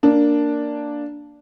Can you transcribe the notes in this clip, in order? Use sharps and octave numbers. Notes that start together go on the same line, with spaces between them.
A#3 D4